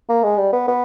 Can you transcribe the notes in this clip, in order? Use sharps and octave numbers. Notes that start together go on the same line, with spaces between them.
A#3
G#3
G3
B3
B3